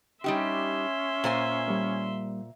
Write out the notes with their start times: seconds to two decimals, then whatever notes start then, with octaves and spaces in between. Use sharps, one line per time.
0.24 G3 C#4 D#4 G4 E5 C6
1.24 A#2 C5 G#5
1.68 G3 A#3